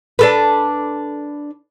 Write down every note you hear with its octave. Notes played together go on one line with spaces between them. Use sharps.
D4 A4 B4